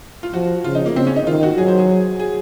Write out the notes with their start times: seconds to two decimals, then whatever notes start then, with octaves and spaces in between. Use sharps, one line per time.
0.23 F4
0.33 F3 F#4
0.64 C#3 F4
0.75 D#4
0.86 A#3
0.95 C#3 C4
1.07 C#4
1.16 D#4
1.27 D#3 F4
1.43 F#4
1.57 F#3 G#4
1.68 C5
1.79 G#4
2.19 G#4